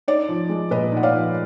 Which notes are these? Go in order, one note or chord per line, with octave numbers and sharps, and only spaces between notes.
D#4 D5
F3
G#3
A#2 B4 D#5
D#4 F#5
D5 F5
F3